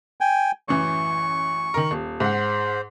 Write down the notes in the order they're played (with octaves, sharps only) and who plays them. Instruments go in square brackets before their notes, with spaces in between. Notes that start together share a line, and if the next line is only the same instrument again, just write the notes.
[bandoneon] G5 G#5
[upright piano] A1 F#2 E3 [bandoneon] C#6
[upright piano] D#3 A#4
D#1
[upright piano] G#2 F#5 [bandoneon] C5